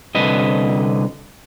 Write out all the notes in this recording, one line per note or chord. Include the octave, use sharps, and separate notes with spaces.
C2 D3 B4 D#5